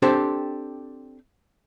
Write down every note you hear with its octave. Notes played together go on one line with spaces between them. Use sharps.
C4 D4 G4 A4 C5